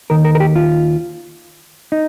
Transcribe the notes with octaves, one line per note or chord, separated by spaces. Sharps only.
D#2 D#3 A#4
A#4
A#4
G4
F4
D#4